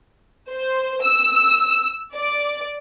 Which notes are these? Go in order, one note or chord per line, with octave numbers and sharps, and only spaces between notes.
C5
E6
D5